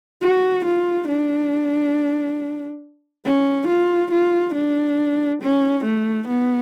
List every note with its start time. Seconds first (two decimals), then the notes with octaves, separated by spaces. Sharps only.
0.22 F#4
0.65 F4
1.08 D4
3.25 C#4
3.68 F4
4.11 F4
4.55 D4
5.42 C#4
5.85 A3
6.28 B3